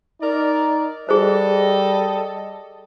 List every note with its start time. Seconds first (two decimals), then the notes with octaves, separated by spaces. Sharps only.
0.21 D#4 A#4 D5
1.09 G3 G#4 A4 C5 D#5